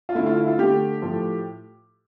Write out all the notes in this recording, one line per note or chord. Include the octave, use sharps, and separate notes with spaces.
F4
D3 A3 E4
F4
E4
F4
D3 A3 G4
A2 F3 A3